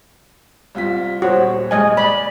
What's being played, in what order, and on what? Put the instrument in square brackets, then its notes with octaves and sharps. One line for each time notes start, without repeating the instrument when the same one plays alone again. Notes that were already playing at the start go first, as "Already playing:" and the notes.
[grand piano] C2 F4 B6
[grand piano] D#1 C5 C#5 [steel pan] F#4
[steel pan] G#3 D#5 G#5
[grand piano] D5 [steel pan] B5